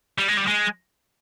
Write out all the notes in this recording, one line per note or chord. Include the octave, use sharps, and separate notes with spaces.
G3
G#3
G3
G#3